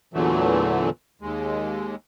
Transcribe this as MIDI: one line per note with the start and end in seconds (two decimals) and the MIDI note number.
0.14 0.90 40
0.14 0.90 46
0.14 0.90 50
0.14 0.90 52
0.14 0.90 54
0.14 0.90 57
1.22 1.95 39
1.22 1.95 56